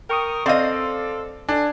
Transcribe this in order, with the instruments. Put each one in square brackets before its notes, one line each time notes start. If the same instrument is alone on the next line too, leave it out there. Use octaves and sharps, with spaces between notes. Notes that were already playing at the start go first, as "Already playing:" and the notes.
[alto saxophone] A#4 [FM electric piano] G5 C#6 D#6
[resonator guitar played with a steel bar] C4 D#5 [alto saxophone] A4 [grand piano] D5 F5 [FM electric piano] C6 E6
[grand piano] D4 [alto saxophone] A4 [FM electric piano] G#5